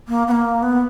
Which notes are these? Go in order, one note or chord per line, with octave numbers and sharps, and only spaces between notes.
A#3
B3
A#3
B3